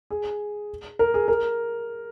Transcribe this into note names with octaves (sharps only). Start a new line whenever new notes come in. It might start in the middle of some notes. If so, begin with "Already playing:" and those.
G#4
A#4
G#4
A#4